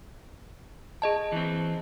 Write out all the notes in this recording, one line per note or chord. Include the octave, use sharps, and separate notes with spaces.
G#4 D#5 A5
E3 C4